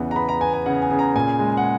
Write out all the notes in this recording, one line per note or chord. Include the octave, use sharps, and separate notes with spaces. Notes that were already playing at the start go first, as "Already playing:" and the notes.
Already playing: E2 C#3 E3 B3 F#5
A#5
B3 B5
A#5
B3 G#5
G#5
C#3 F#5
G#5
C#3
A#5
A#2 G#5
G#3
F#5